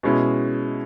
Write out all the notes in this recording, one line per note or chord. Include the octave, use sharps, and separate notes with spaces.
B2 G#3 C#4 E4